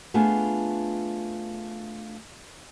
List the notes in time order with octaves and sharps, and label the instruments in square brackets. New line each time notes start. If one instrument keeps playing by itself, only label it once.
[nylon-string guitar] A3 B3 D4 F4 G#4